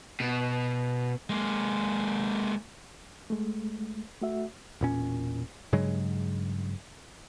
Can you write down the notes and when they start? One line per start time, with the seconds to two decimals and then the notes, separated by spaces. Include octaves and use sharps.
0.20 B2
1.30 G#3 A#3
3.30 G#3 A3
4.22 A3 F#4 E5
4.81 E1 A#2 C#4
5.73 G2 C#3 F#3 G#3